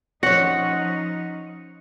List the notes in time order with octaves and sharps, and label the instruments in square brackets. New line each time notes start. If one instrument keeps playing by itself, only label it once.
[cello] F3 D#4 [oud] C#4 C#5 [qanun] F#5 [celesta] A#6 C#7